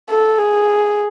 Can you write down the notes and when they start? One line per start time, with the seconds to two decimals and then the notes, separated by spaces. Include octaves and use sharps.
0.10 A4
0.39 G#4